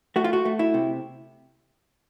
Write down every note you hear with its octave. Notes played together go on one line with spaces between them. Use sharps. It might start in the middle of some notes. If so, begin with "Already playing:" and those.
A3 F#4
F4
F#4
A3
E4
C3